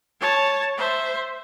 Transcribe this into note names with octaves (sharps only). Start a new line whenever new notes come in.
C#5 A5
C5 E5